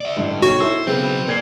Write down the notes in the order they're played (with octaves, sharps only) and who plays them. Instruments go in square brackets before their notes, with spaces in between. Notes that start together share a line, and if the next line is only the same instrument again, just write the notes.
[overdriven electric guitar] D5 E5
[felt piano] A1 D3 [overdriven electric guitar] G2
[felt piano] B1 [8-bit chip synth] F#4 [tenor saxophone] C#5
[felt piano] E4 A4 E6 [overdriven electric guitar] C5
[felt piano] C#3 B3 [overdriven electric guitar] F#3 B4 [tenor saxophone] C4
[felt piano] A#2 G#6 C7 [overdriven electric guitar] A#4 D5